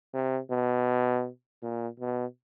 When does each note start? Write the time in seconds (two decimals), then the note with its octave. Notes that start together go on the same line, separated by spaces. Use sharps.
0.14 C3
0.51 B2
1.62 A#2
2.00 B2